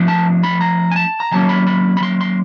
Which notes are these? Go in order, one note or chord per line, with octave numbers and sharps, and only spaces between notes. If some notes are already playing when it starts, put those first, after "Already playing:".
Already playing: F3 A3 D4
A5
B5
A#5
G#5
A5
A#5
D#3 F#3 A#3 C#4 A5
B5
B5
B5
C6
C6